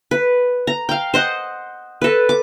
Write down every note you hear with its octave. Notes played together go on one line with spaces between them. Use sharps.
B4
A#5
F5 G5
C5 D#5 F#5
A4 B4
D6